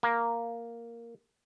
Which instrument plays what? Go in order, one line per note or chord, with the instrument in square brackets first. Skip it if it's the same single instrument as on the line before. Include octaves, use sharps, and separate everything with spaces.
[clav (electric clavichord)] A#3